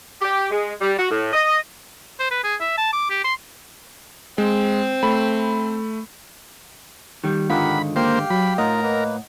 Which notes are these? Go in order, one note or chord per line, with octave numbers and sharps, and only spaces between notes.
G4
G#3
G3
F#4
A2
D#5
C5
B4
G#4
E5
A5
D6
G4
C6
G#3 C4
A3 B5
D#3 G3
G#2 D3 D#3 F4 G4 A#4 F#5 B5
A#3 G4 C5 F5 G5
F#3 B5
A2 D#4 F4 A#4 D#5 F#5
A#3 B4